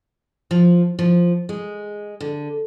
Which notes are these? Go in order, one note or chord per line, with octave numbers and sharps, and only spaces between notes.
F3
F3
G#3
D3